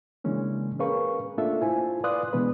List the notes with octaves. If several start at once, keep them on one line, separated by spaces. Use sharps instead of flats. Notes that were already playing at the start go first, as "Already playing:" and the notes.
C#3 E3 G#3 A#3 C#4 D4
C#4 G#4 A#4 B4 F5 C#6
A3 A#3 D4 F4 A4 E5
E4 F4 C5 G#5
B4 D5 F5 C6 D#6 F#6
B2 E3 G#3 B3 D4 B4